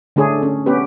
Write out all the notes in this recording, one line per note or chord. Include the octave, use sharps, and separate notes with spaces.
D3 A3 D4 G#4 C#5
C#4
B3 C#4 G4 B4